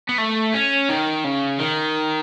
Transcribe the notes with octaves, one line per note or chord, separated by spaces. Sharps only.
B3
A3
C#4
D#3
C#3
D#3